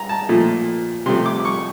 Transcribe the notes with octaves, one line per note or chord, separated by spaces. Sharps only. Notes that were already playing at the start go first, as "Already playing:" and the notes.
Already playing: A#5
A5
A#2 F3 A3
C3 F3 A3 C6
D6
C#6